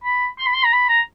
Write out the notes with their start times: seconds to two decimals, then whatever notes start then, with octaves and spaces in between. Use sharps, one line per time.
0.04 B5
0.39 C6
0.47 B5
0.54 C6
0.65 A#5
0.73 B5
0.89 A#5